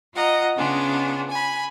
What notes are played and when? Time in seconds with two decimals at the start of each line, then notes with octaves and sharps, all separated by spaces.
0.14 F4 D#5 F#5 A#5
0.56 C#3 B3 D4 F4 G#4
1.30 G#5 B5